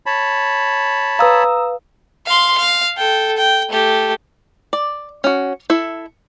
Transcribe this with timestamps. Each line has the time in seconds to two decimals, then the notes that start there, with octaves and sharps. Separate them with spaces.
0.06 C#5 A5 B5
1.19 B4 F5 A#5 D#6 E6
2.26 F5 C6
2.57 F5
2.97 A4 G5
3.37 G5
3.69 A3 G4
4.73 D5
5.24 C#4 F#4
5.70 E4 A4 E5